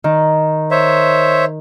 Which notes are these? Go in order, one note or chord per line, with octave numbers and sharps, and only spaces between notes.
D#3
C5 C#5 E5